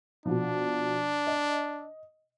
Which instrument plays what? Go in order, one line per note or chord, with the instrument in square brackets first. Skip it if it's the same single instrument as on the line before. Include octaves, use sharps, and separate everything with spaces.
[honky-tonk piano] B2 F3 [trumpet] D4
[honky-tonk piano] D#5